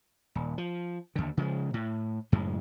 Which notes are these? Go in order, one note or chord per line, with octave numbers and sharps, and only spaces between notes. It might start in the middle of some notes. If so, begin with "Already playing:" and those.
D#1
F3
D#2 D3
C#3 F3 G3 G#3
A2
F#1 F#2 A2 G#3